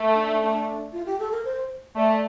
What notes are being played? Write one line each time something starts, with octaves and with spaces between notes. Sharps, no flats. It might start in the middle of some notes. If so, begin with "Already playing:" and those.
Already playing: A3
D4
D4
F4
G4
A4
A#4
C5
A3 D5